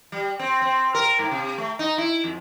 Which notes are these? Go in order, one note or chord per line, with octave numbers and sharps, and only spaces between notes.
G3
C4
C4
A#4
G#2
C3
A3
D#4
E4
F2